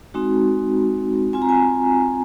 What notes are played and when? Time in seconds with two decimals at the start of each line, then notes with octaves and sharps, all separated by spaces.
0.14 G#3 C4 D#4 F#4
1.33 C4 F4 G#5
1.42 A#5
1.49 G#5